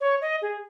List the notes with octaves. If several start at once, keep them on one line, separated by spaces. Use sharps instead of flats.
C#5
D#5
G#4